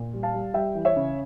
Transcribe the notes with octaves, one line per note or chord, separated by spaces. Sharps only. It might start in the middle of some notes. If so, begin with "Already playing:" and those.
Already playing: A#2
G3
F5 A5
G3
G3 E5 G5
E3
C#5 E5
C#3